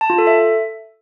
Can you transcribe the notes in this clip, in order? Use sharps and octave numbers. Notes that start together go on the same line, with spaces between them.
A5
F4
A4
E5